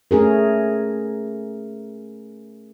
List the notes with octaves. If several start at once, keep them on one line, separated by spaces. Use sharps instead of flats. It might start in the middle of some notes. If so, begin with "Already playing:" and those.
A3 C#4 G#4 A#4